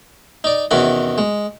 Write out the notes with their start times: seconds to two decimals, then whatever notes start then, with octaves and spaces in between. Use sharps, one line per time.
0.44 D#4 D5
0.71 E2 C3 D#3 C#4 F#4 B5
1.18 G#3